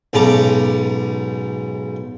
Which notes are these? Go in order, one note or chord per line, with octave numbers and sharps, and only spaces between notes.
B1 G#2 C#3 A5 A#5 D6